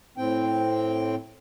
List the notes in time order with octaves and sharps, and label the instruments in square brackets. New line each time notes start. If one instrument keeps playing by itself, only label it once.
[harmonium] A2 C4 G5